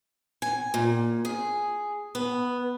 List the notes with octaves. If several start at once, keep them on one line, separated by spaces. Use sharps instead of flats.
G#5
A#2
G#4
B3